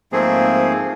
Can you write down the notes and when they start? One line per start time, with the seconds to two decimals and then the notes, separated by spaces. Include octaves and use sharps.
0.12 G#2 F3 A3 A#3 C4 G#4